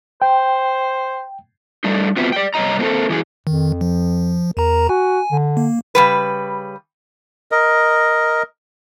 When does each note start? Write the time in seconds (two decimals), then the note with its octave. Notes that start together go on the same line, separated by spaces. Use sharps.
0.22 C5 G5
1.84 G3 A3 D4 D#4
2.17 B3 C4 F4 F#4 B4 E5
2.32 D5 G5
2.54 G2 C3 C#5 D#5 A#5
2.79 A#3 C4 F4 A4
3.09 F#2 E3 F#3 G#4
3.47 F2 D#3
3.81 F3
4.57 E2 A#4 A#5
4.89 F#4 G#5
5.32 D3
5.57 A#3
5.95 C#3 G3 B4
7.52 A#4 D#5